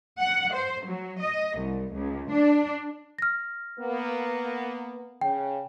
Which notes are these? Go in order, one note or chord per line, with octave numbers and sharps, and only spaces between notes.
F#5
C5
F#3
D#5
C2
C#2
D4
F6 A#6
A#3 B3
C#3 G5